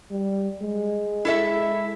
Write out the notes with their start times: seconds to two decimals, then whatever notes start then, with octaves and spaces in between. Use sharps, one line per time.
0.11 G3
0.61 G#3
1.25 E4 A4 E5